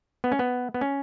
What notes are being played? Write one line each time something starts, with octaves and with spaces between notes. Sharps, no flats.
B3
C#4
B3
B3
C#4